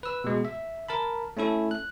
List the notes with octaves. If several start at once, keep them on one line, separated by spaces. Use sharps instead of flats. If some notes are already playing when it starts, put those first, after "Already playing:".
B4 E6
B2 G#3
E5
A#4 A5 B5
A3 C#4 E4 A4
F#6